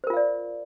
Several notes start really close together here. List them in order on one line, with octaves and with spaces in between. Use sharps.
C5 A#4 F4 F5 D5